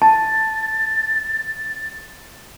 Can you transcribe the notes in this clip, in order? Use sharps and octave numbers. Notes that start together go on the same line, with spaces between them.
A5 A6